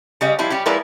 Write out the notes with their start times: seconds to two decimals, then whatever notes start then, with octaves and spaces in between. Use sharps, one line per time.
0.21 C#3 G3 D#5
0.39 F3 G3 E4
0.50 G3 C#4 G4
0.66 F3 G#3 E4 A#4 B4 D5